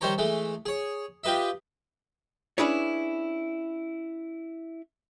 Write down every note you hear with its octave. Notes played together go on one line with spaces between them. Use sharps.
D#3 G3 C5 C#5 A#5
E3 G#3 A3
G#4 C#5
F4 G4 B4 D#5 E5
C#4 D4 E4 G#4 B4 C#5